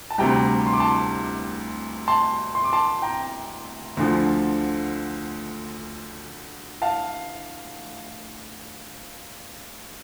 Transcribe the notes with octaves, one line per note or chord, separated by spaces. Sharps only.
A5
D2 C3 G3 G5 A#5
C6
D6
A5 C6
A5 C6
C6
D6
A5 C6
G5 A#5
D2 D3 F3
F5 A5